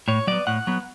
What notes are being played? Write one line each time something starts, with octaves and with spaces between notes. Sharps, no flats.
A2 C#5
F#3 B3 D5
A2 F#5
F#3 B3